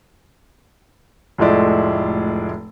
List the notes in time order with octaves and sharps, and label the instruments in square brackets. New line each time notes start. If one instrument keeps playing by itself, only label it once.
[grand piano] F1 A2 F3 G#3 D5 E5